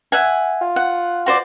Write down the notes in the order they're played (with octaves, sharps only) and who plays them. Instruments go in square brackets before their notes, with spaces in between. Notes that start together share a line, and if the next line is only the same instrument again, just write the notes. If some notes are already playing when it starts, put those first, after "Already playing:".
[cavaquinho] E5 F#5 G#5
[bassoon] F4
[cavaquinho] F#5
F#4 C5 D5